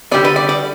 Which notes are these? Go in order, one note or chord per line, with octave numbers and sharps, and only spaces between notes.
D3 G3 B3 D5
B4
D5
D5